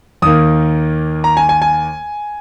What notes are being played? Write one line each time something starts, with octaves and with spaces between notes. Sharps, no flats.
D#2 D#3 A#3 D#6
A#5
G#5
G#5
G#5